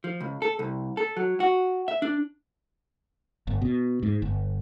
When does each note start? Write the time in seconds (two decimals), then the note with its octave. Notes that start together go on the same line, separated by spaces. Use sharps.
0.04 F3
0.21 C#2
0.42 A4
0.59 C2
0.97 A4
1.17 F#3
1.40 F#4
1.88 E5
2.02 D4
3.47 G1
3.62 B2
4.03 G#2
4.22 G1